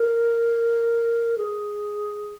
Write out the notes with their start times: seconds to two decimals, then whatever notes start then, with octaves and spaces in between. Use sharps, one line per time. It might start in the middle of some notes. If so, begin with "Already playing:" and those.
Already playing: A#4
1.38 G#4